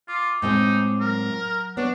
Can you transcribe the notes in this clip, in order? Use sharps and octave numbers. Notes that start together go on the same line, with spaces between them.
F4 D6
A2 G#3 C4 D#4
F#3 A#4
B3 D4 C#5